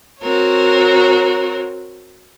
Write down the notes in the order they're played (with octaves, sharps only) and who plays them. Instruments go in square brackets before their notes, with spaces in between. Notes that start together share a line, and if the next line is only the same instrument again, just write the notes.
[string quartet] C4 F#4 A#4 C#5